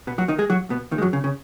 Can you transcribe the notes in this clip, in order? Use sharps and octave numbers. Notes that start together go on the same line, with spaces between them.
B2 B3
F#3 F#4
D#3 D#4
G#3 G#4
F#3 F#4
B2 B3
D#2 D#3
G#3
F#2 F#3
C#3
C#3